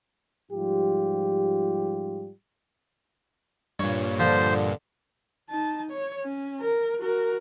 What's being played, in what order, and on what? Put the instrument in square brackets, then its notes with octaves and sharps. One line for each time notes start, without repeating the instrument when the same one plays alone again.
[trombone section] G#2 F3 G3 F4 G4
[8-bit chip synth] G2 A#2 [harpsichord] C#5
[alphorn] D3 [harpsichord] F3 [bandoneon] C5
[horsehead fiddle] D#4 A5
C#5
C#4
A#4
F#4 A#4